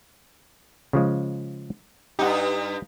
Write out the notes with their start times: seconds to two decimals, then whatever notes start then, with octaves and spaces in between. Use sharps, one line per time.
0.93 C#3 F3 G#3
2.19 G2 D#4 G4 F#5